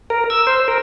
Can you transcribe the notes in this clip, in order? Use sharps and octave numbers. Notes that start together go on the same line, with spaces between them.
A#4
E6
C5
A#4